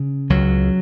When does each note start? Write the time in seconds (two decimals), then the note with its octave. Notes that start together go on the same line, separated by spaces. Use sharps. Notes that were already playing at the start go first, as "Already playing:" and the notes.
Already playing: C#3
0.30 C#2 F#3